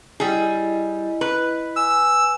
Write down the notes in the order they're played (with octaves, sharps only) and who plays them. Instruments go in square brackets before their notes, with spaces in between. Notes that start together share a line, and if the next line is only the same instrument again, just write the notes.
[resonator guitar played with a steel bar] G3 G#4 [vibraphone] E4 D#5
[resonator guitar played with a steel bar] B4
[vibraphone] G#5 [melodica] E6